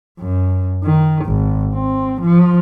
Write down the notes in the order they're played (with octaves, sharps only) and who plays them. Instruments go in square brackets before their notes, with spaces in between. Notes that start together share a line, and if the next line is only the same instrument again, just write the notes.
[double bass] F#2
D#3
G#1
C4
F3